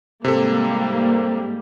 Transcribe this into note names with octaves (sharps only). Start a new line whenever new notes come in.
G#2 C3 G3 A#3 A4